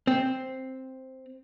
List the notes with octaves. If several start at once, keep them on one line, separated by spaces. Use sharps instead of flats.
C4